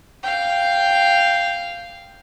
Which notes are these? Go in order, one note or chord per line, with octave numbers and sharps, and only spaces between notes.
F5 G5